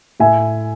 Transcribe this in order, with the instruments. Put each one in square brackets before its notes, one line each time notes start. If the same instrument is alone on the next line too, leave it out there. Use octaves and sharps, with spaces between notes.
[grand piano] A2 E5 G#5